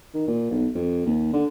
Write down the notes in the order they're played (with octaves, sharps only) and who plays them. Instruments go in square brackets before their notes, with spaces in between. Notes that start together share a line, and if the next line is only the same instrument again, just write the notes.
[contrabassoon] D#3
A#2
B1
F2
D#2
D3